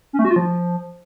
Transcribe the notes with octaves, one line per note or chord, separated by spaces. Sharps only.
C#4
A3
F#4
F4
F3